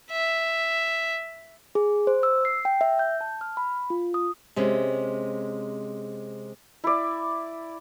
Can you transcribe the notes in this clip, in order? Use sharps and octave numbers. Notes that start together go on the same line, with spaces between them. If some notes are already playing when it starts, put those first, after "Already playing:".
E5
G#4
C5
E6
C7
G5
E5
G6
A5
F6
B5
F4
D#6
C3 G#3 C#4
E4 D5